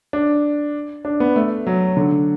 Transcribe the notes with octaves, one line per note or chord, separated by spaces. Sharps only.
D4
D4
B3
A3
F#3
D3